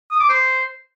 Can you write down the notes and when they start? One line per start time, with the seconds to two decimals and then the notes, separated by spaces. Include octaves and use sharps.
0.11 D#6
0.20 D6
0.29 C5